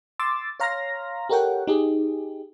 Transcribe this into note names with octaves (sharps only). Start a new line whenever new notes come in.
C6 D6 E6 A6
C#5 F5 A#5 C6 F6 A#6
G4 A4 A#4 C#5 F#5 G5
D#4 G4 G#4